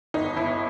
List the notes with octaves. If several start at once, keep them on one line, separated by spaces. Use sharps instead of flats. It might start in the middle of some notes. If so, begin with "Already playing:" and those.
G1 D#4
G1 E4